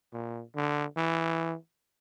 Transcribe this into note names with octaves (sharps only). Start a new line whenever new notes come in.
A#2
D3
E3